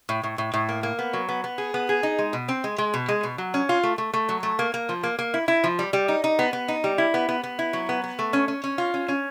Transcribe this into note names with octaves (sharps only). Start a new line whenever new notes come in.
A2
A2
A2
A2
A#3
A#3
B3
F#3
B3
B3
G#4
B3
G#4
D#4
G#3
B2
C4
G#3
G#3
B2
G#3
B2
F#3
C#4
F4
A3
A3
A3
F#3
A3
A#3
A#3
F3
A#3
A#3
E4
E4
F3
G3
G3
D#4
D#4
B3
B3
D#4
G3
E4
B3
B3
B3
E4
F#3
B3
B3
A3
C#4
C#4
C#4
F4
C#4
C#4